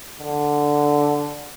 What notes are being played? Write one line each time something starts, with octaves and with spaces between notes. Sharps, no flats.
D3